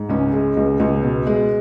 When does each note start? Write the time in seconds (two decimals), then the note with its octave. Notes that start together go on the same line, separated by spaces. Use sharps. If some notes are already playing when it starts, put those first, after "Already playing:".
Already playing: G#2
0.09 C#2 C#4
0.33 G#3
0.57 C#2
0.80 C#2
1.03 B2
1.27 G#3